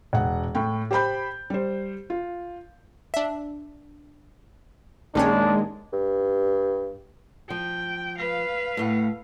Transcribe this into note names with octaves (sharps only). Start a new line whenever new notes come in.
E1 F#5
A2 G5
G4 C5 G5 B5 G6
G3 C5
F4
D4 E5
A#1 D#3 G#3 A#3 C#4 D4 G4 C#5
G2
F3 G5
B4 F5
A2 A3 F#5